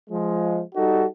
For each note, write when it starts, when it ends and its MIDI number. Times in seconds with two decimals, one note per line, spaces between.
0.10 0.60 53
0.10 0.60 56
0.75 1.05 55
0.75 1.05 63
0.75 1.05 66
0.75 1.05 69